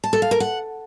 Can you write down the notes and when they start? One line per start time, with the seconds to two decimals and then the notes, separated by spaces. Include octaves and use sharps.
0.04 A5
0.13 A4
0.22 F5
0.31 A#4
0.40 F#5